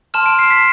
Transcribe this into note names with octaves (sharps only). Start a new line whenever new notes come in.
A5 C6 F6 E7
D7
C7
B6